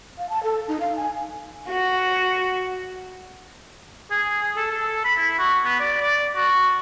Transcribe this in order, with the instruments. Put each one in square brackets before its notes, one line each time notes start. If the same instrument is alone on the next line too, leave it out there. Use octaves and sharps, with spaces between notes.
[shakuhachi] F5
A5
A4
D#4
F5
G#5
[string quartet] F#4
[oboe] G#4
G#4
A4
A4
B5
E4
F#4
B3
D5
D5
F#4